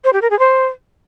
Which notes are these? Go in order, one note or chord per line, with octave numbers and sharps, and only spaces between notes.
C5
G4
A#4
G#4
C5